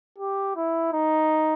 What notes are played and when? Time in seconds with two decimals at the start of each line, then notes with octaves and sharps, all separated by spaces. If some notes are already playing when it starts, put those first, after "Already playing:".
0.18 G4
0.56 E4
0.93 D#4